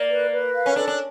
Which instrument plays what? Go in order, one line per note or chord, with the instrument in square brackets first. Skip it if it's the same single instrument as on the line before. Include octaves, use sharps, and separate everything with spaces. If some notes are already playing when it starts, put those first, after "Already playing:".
Already playing: [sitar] A#3 [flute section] D5
[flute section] B4
B4
F5
[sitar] C#4
[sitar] D4 [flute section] A4
[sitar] D4